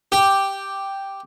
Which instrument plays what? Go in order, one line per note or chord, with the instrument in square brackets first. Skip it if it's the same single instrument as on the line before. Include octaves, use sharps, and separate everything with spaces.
[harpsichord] G4